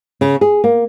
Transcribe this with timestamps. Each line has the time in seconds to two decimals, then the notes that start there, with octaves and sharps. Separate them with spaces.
0.21 C#3
0.41 G#4
0.64 A#3